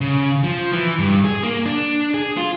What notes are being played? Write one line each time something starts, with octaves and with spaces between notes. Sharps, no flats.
C#3
F3
E3
G2
G#4
A#3
D4
G#4
F4